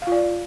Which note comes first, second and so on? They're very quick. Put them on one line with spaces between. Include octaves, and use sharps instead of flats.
F5 F4 D5